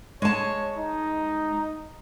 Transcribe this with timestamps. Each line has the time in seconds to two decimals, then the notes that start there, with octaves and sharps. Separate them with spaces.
0.22 G#3 C#5 A5
0.77 D#4